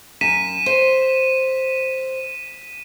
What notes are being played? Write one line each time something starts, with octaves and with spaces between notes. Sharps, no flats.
F#2 B6 D#7 E7
C5